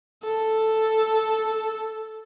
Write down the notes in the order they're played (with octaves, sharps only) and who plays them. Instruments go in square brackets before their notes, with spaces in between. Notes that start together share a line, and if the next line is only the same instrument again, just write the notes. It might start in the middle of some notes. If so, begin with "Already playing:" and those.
[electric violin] A4